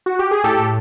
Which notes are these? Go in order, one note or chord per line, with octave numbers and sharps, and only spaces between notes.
F#4
G4
G#4
A2 G4 A4
A2